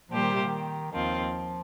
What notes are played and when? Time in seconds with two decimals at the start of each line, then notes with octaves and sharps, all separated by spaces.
0.10 A#2 F3 G3 A#3 G4 C5
0.22 D#3
0.33 C3
0.46 D#3
0.92 D#2 D#3 F3 C4 F4